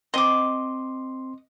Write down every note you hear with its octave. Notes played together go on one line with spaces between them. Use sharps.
C4 D#5 C6 D6